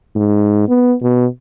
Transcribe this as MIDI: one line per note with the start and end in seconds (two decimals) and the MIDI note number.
0.16 0.67 44
0.69 0.94 59
1.02 1.26 47